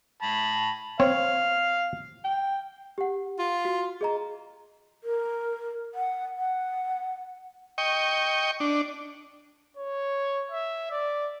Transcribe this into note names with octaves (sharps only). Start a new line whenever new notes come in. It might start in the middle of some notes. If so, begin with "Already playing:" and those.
A5 B5
C4 C#5 F5
G5
G4 F#5
F4
F#4
G#4 D#5 A#5
A#4
F#5
F#5
D#5 G5 C#6
D4
C#5
E5
D5